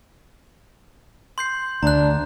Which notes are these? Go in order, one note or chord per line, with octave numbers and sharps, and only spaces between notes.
C6 G6 C7
D2 D4 A#5 F#6